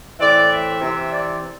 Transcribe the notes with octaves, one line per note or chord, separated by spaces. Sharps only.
A2 E3 C4 D5
E5
C3 E3 C4
D5